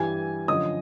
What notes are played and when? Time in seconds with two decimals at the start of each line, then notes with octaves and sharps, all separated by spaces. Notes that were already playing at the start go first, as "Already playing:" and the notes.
Already playing: G2 E3 G3 G#5 G#6
0.48 F#2 D3 F3 D#5 D#6